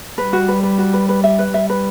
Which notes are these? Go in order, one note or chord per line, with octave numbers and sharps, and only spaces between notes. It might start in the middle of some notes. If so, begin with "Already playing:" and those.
G3 B4
F#4
B4
B4
F#4
B4
B4
E5
B4
G3 E5
B4